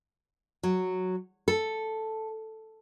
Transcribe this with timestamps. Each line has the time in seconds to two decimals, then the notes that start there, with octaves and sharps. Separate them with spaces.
0.63 F#3
1.48 A4